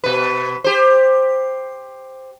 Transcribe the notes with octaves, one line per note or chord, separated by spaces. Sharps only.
B2 B4
G4 C5